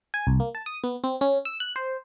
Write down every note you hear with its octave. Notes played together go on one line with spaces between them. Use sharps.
G#5
C2
A#3
A5
D#6
B3
C4
C#4
E6
F#6
C5